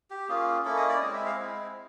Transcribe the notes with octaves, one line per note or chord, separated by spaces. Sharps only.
G4
A#3 C#4 F4 G#4
A#3 C#4 E4 A4
D#5
D5
G#3 C4 E4 D#5
E5
F5
G#3 C4 E4